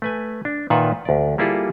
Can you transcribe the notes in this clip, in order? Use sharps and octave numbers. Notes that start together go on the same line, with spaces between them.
A3 B4 G#5
D4
A#2 D#3 F4 B4 E5 F#5
D2 D5
G3 A#3 E4 F4 G#4 A4